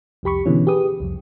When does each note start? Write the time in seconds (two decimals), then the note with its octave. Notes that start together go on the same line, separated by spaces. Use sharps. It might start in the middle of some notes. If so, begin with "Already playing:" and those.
0.23 C2 F2 G4 B5 C#6
0.46 B2 D3 E3 C#4
0.67 G4 G#4 B4 D#6
1.00 C2 F2